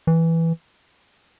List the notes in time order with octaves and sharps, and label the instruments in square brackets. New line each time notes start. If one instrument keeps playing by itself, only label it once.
[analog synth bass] E3